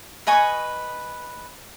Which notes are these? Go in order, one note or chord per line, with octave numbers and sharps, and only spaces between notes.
B4 D#5 G#5 C#6